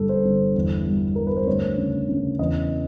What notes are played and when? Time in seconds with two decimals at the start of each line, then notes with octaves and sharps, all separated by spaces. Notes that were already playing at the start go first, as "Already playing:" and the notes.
Already playing: G1 G3 A4
0.09 C5
0.24 G1
0.55 E2
0.86 G3
1.16 G3 A#4
1.27 B4
1.37 C5
1.47 D2 C#5
1.78 C#3
2.09 C#3
2.39 E2 D#5